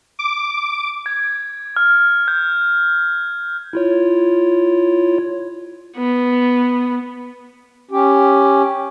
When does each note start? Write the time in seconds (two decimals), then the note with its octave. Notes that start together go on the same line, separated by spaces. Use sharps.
0.19 D6
1.06 G#6
1.77 F6
2.28 G6
3.73 E4 F4 C#5
5.97 B3
7.91 C#4 G4